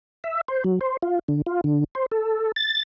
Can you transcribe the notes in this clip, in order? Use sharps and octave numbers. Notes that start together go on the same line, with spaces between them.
E5
C5
F#3
C5
F4
D3
F4
D3
C5
A4
A6